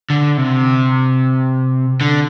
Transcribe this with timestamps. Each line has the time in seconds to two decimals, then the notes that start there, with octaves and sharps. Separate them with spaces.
0.10 D3
0.37 C3
2.01 D3